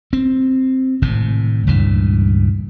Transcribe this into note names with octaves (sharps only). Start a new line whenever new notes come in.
C4
G#1 A2 C3
C#2 G2 A#2 E3